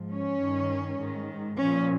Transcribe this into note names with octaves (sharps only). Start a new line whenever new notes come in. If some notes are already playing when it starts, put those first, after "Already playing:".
Already playing: G#2 F3
C#4
G2 D#3
G#2 D#3
A#2 F3 C#4